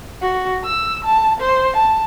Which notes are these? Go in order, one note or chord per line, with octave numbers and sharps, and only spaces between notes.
F#4
E6
A5
C5
A5